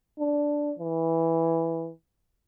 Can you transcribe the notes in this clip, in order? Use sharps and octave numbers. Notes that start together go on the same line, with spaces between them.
D4
E3